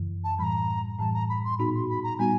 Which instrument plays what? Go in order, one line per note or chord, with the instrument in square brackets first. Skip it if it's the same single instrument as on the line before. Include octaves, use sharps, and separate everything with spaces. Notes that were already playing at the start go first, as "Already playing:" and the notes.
Already playing: [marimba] F#2 C#3 E3
[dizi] A5
[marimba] A2 E3 G3 [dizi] A#5 B5
[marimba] A2 E3 G3 [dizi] A5
[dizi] A#5
B5
C6
[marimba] A#2 G3 B3 D#4 F#4 [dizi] B5
[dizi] C6
B5
A#5
[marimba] A#2 G3 B3 D#4 F#4 [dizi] G#5